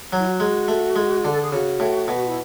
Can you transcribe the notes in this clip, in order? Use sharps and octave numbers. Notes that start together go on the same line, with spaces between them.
F#3
E4
F#4
G#3
A3
G#3
D3
A4
G#4
C#3 F#4
A2
B2
E4